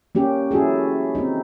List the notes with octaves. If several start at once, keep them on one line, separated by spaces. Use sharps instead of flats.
A#3 C#4 G4
C#4 E4 F#4 G#4 A4
C4 D#4